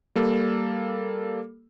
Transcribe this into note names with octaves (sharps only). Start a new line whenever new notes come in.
G3 A#3 A4